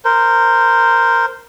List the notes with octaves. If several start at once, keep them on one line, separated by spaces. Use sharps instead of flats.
A#4 C5